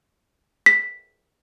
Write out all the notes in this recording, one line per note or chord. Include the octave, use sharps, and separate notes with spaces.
B6